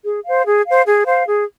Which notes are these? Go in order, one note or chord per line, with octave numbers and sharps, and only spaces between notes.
G#4
C5 F5
G#4
C5 F5
G#4
C5 F5
G#4